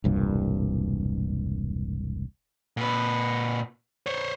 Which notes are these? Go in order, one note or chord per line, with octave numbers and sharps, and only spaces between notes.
E1 C2 G2 A#2
A#2 B4
C5 C#5